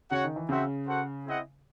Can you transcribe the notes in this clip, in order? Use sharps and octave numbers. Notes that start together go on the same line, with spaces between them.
C#3 F#4 C#5 F#5
D#3
E3
C#3 C4 F#4 C5 E5
F#4 A4 C5 F#5
C4 E4 G#4 D#5 F#5